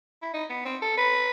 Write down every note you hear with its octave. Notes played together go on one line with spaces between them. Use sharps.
E4
D#4
B3
C4
A4
B4